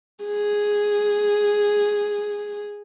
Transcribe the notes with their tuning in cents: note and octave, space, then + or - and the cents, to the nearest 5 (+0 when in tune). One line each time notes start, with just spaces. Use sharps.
G#4 -5